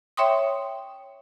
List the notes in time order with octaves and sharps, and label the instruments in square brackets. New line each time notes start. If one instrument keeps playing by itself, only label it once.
[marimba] C#5 E5 G5 C6 C#6 D#6